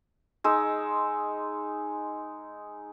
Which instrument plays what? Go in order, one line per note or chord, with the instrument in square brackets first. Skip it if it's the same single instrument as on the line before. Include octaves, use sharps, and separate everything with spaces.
[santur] G#3 D#4 E6